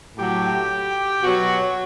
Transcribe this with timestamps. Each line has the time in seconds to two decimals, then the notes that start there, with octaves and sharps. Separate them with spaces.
0.17 A2 F#3 G4
1.21 B2 F#3 F#4